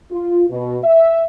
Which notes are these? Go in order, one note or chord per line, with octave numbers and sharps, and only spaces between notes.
F4
B2
E5